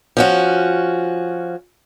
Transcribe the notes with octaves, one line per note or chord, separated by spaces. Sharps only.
F3 C#4 F#4